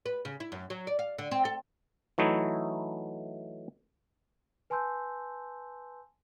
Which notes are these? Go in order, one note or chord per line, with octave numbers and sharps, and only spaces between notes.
B4
C#3
E4
F#2
F#3
D5
F5
D3
C4
A4
E3 F#3 A3 D#4 E4
B4 G#5 A5 C6 E6 G6